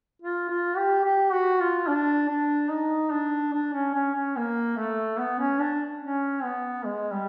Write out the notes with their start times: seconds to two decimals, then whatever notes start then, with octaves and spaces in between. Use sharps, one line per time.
0.22 F4
0.50 F4
0.77 G4
1.04 G4
1.33 F#4
1.60 F4
1.87 D4
2.28 D4
2.71 D#4
3.12 D4
3.53 D4
3.74 C#4
3.95 C#4
4.15 C#4
4.36 A#3
4.77 A3
5.19 B3
5.40 C#4
5.60 D4
6.02 C#4
6.43 B3
6.85 G#3
7.12 G3